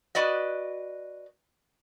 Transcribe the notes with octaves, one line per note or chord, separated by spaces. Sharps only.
F#4 B4 D5 D#5